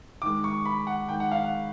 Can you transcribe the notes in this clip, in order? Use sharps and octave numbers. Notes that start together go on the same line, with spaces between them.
D#3 G#3 D6
C#6
B5
F#5
D#3 G#3 G5
F#5
F5
F#5